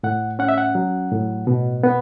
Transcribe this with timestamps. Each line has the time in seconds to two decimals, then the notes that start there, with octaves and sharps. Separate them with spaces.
0.03 A2 F#5
0.39 C#4 F#5
0.49 E5
0.58 F#5
0.75 F#3
1.11 A2
1.47 B2
1.83 B3